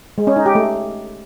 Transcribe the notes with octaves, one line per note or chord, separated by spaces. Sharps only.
G#3
C#4
D#4
G4
A3